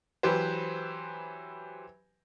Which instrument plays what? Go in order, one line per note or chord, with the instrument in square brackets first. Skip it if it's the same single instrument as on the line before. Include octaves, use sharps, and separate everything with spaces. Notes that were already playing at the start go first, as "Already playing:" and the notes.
[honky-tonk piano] E3 F#3 G4 B4 C5